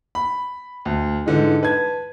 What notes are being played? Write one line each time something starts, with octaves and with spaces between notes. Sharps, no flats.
B5
D2
G#2 D3 E3 G#3
B4 A5 G#6